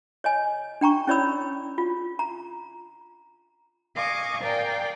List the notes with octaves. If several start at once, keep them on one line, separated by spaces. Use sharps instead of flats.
C#5 D#5 G#5
D4 G5 A#5 C#6
C#4 E4 C#5 D5 B5 E6
F4
A#5
D#5 F5 G#5 C#6 D6
A#4 D5 F5 G5 G#5 A#5